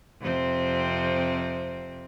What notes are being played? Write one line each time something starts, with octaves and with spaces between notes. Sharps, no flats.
F2 C3 C4